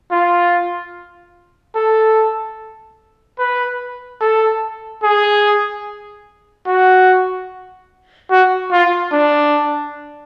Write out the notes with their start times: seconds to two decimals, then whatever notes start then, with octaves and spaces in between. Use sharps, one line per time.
0.12 F4
1.75 A4
3.39 B4
4.21 A4
5.03 G#4
6.67 F#4
8.31 F#4
8.72 F4
9.13 D4